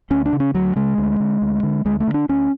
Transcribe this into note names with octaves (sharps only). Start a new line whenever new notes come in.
D2 C#4
D4
C#3
C#4
D2 F#3
C#3 G#3
D2
D3
D2
D3
D2 G#3
A3
D3
D4
D2 C#4